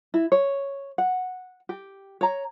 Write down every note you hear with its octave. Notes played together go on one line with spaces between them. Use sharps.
E4
C#5
F#5
G4
C#5 A#5